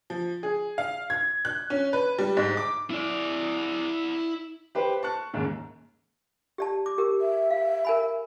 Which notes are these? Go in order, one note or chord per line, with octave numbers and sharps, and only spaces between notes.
F3
G#4
F5
G#6
F#6
C#4
B4
G3
G#2
D6
E4 D5
G4 B4 C5
A5 C#6 F#6
D#2 G#2 C#3
G4 D5 A5
D6
G4 A#4
E5
F5
A#4 G#5 B5